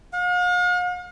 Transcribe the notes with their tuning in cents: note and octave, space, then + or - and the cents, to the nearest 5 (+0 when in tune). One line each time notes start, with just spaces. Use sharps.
F5 +45